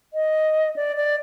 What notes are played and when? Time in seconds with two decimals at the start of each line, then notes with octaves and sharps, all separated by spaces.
0.14 D#5
0.76 D5
0.96 D5